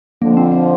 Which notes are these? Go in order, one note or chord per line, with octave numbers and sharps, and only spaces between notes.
F2 D3 F3 A#3
C4
C4